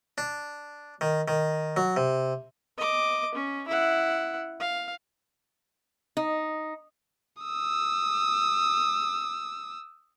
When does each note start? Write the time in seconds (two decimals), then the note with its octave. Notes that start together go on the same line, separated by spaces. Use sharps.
0.18 D4
1.01 D#3
1.28 D#3
1.77 F#3
1.97 C3
2.77 D#5 D6
3.35 C#4
3.68 E4 F#5
4.60 F5
6.17 D#4
7.43 D#6 E6